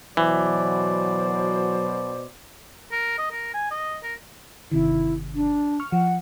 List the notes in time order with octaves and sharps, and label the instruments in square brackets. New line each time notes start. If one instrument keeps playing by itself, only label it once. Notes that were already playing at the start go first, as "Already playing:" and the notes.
[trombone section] B2 C5 [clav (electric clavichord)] E3 [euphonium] F#3 [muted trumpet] D5
[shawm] A#4
D#5
A#4
G#5
D#5
A#4
[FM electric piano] G1 C3 D#3 [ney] E4
[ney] D4
[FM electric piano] C#6 F6
[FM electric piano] F3 [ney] F#5